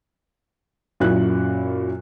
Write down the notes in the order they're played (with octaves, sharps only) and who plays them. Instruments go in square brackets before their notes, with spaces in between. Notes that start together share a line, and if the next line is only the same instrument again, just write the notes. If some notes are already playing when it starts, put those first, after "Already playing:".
[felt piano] F#2 A#2 F#3 E4 F#6